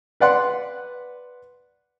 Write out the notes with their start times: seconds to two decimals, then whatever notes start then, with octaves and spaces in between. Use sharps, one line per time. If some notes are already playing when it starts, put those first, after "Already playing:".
0.20 B4 D5 F#5 C6